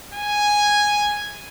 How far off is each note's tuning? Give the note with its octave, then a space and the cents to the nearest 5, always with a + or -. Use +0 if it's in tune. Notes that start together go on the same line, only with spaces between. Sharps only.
G#5 -5